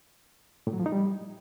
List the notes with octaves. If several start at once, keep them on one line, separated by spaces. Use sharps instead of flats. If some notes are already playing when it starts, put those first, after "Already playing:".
A2
F#3
F3
D#4
G3